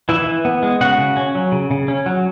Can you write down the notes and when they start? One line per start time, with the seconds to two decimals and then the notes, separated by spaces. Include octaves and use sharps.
0.09 E3 E4 E5
0.27 E3
0.45 B3
0.63 G#3
0.81 C#3 F#4 F#5
0.98 C#3
1.17 C#4
1.35 F#3
1.52 C#3
1.71 C#3
1.88 C#4
2.06 F#3